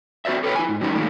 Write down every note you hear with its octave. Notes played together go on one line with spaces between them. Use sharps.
C4 F#4 C5 D5 E5
G4 A4 B4 C#5 G5
E4 G#5
G#2
F#3 G3 C#4 D#4 E4 A#4
A2 D#3 G3 G#3 A#3